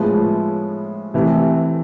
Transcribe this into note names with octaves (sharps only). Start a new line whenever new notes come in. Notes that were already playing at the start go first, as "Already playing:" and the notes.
Already playing: A2 F3 G#3 B3
C3 E3 A3